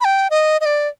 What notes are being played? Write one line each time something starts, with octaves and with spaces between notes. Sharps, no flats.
B5
G5
D#5
D#5
D5